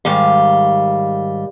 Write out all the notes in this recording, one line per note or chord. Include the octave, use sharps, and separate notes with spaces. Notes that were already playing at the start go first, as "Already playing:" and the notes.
G#2 D#3 G3 F5